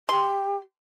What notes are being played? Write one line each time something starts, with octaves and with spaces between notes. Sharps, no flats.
G4 C6